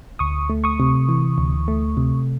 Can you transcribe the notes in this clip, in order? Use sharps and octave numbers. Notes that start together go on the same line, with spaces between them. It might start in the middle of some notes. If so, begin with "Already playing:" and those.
D2 C#6 D#6
A3
C#6 D#6
C3
E3
D2
A3
C3